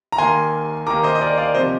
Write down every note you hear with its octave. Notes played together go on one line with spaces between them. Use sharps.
A#5
D#2 D#3 A#3 G#5 C6
D#2 D#3 A#3 A#5 D6
C5 D#5
D#5
A#4 D5
D5 F5
C3 F3 C5 D#5